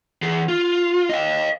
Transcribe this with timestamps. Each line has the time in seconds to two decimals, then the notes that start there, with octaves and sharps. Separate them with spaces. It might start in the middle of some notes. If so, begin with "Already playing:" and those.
0.22 E3 G#4
0.48 F4
1.09 D#5 F5